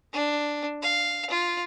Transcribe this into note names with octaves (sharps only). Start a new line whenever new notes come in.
D4
F5
F4